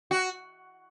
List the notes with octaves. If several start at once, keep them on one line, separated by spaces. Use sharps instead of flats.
F#4